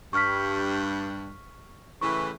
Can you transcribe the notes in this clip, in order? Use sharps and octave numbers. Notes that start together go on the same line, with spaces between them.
G2 C#6 F6 B6
A2 C#3 E3 C#6